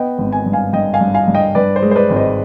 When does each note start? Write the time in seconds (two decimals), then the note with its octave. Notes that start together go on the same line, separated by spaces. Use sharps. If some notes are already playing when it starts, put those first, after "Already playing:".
Already playing: B3 D#5 G5
0.18 G#1
0.32 G#5
0.46 G2
0.53 F5 G#5
0.73 G2 D#5 G5
0.94 F5 G#5
1.01 G2
1.14 F5 G#5
1.28 G2
1.34 D#5 G5
1.55 G2 B4 D5
1.76 C5
1.82 G#3
1.91 C5
1.96 B4 D5
2.10 G#1
2.16 C5 D#5